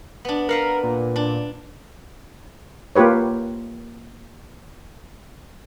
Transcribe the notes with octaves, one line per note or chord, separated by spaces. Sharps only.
B3 D4
A#4 B4 F5 F#5
A#2
D4
A#3 F4 G4 B4 C#5